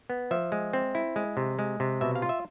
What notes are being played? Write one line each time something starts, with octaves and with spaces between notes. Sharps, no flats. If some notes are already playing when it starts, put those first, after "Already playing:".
B3
F3 E5
G#3
C4
E4
G#3
C3
G#3
C3
B2 E5
F5
F4
E5